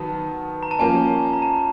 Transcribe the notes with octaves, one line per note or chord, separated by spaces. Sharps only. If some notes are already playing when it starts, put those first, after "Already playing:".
Already playing: D#3 F#3 B3 A5
A#5
A5
F3 A#3 C#4 G#5
A#5
A5